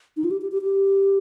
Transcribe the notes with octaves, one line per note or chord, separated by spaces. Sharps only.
D#4
F4
G4
G4
G4
G4